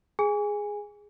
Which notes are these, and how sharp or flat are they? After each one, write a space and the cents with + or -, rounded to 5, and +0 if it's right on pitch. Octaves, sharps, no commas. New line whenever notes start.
G#4 +0 G#5 -15